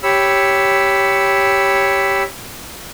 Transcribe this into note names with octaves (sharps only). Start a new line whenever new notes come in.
G4 C#5 B5 E6